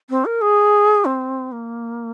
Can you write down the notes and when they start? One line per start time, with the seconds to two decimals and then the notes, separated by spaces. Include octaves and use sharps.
0.10 C4
0.25 A#4
0.41 G#4
1.05 C4
1.52 A#3